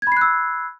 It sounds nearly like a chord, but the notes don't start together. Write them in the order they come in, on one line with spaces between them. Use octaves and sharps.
G#6 B5 C7 F#6 E6